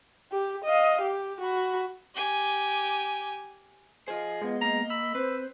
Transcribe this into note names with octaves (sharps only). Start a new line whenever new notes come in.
G4
D#5 F5
G4
F#4 B5
G4 G#5
F4 G#4 C5 D#5
G#3 B3
A#3 A#5
B5 E6
C4 B4 C5